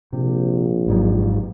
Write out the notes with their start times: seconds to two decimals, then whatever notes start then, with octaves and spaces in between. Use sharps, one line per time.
0.13 A#1 C3
0.86 G#1 G#2 F#3